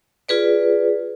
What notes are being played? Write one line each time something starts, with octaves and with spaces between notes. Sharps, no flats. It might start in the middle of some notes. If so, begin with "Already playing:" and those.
F4 G#4 B4 D5